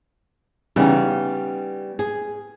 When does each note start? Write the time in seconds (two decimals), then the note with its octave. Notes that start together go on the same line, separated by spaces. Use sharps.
0.76 C#3 E3 G3 B3 D#4
1.99 G#4